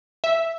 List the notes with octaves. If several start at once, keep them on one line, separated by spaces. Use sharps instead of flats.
E5